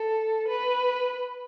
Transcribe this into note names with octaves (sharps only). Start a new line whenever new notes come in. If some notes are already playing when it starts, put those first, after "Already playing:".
Already playing: A4
B4